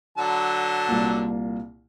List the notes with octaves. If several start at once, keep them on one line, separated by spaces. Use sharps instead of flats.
D3 F#3 A5
C2 A#2 A#3